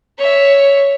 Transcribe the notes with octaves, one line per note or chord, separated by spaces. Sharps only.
C#5 E5